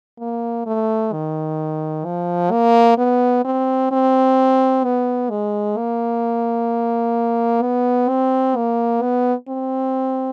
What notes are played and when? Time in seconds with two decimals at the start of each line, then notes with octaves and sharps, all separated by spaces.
0.19 A#3
0.67 A3
1.13 D#3
2.05 F3
2.51 A#3
2.98 B3
3.45 C4
3.91 C4
4.84 B3
5.30 G#3
5.77 A#3
7.62 B3
8.09 C4
8.56 A#3
9.02 B3
9.49 C4